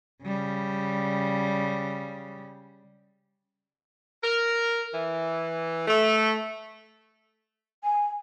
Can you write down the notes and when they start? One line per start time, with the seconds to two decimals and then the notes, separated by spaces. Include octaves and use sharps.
0.23 C#3 G3
4.23 A#4
4.93 E3
5.87 A3
7.84 G#5